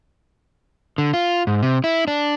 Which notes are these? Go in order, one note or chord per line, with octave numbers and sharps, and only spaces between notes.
D3
F4
G#2
C3
E4
D4